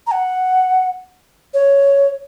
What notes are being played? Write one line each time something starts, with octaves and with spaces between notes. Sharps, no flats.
A#5
F#5
C#5